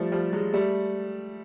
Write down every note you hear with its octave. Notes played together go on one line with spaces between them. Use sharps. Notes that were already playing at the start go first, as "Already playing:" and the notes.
Already playing: F3 G3 A3
F3 G3
F#3 G#3
G3 A3